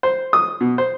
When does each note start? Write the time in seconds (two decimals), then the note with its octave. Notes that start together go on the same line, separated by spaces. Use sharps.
0.03 C5
0.33 D#6
0.61 B2
0.78 C5